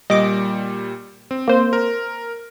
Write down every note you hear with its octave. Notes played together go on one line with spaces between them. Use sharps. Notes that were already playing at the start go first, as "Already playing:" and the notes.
A#2 G3 D#5 D6
C4
A#3 C5
A#4